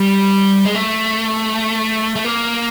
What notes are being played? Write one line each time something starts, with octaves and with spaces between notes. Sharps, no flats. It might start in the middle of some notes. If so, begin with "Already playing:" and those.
Already playing: G3
G#3
A3
A3
A#3